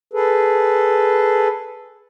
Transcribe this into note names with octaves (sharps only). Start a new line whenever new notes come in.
G#4 A4 B4